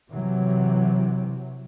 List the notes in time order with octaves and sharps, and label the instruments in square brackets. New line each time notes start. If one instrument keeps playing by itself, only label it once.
[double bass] C3 [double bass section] E3 F#3